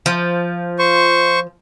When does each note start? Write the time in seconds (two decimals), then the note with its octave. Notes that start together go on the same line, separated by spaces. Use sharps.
0.06 F3
0.79 C5 C#6